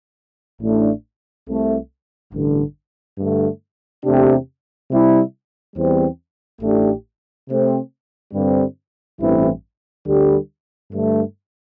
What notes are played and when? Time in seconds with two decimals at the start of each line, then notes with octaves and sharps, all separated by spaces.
0.60 A1 A2 A3 D4
1.46 C2 C3 A3
2.32 A1 G2 D3
3.17 G2 D3 A3
4.03 E2 C3 A3 D4 G4
4.90 C3 G3 E4
5.76 E2 E3 G3 C4
6.61 A1 A2 A3 D4 G4
7.48 C3 A3 C4
8.33 G2 D3 G3 C4
9.20 A1 G2 E3 C4 E4
10.05 D2 D3 G3
10.91 G2 D3 A3